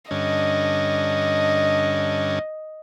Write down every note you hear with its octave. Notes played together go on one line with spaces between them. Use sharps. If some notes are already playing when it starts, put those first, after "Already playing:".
G2 D3 C#4 D#5